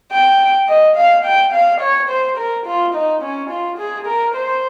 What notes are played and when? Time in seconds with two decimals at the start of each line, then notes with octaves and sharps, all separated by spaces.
0.11 G5
0.68 D#5
0.97 F5
1.25 G5
1.53 F5
1.81 C#5
2.10 C5
2.37 A#4
2.66 F4
2.94 D#4
3.22 C#4
3.50 F4
3.78 G#4
4.07 A#4
4.35 C5